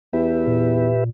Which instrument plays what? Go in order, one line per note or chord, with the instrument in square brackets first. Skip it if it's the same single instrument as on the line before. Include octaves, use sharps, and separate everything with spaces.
[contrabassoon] E2 [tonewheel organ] G4 B4 E5
[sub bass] A#2